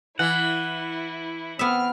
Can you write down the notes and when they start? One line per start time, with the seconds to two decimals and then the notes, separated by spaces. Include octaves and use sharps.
0.19 E3 E4 F#5
1.59 B3 C4 E5 F6